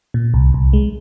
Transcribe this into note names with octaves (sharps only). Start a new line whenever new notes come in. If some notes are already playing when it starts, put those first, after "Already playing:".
A#2
C2
C2
G#3